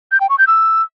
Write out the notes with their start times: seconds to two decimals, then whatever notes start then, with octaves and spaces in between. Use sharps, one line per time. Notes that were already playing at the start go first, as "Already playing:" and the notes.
0.11 G6
0.20 G5
0.29 C#6
0.38 G6
0.47 E6